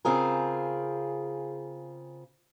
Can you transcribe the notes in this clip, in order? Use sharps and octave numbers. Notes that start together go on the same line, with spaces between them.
C#3 C4 F4 G#4 A#4